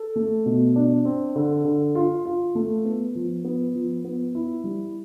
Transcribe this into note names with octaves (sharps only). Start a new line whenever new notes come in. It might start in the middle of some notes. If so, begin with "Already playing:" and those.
Already playing: A4
A3
B2
D4
C4
D3
D3
F4
F4
A3
B3
F3
B3
F3
B3
E4
G3